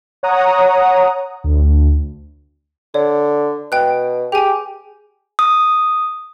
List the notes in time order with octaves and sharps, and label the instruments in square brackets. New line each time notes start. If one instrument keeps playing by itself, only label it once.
[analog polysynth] C#5 F#5 A#5 D#6
D2
[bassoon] D3 [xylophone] C#5
[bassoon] B2 [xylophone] G5 F#6
[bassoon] G4 [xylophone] G#4 G#5
[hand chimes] D#6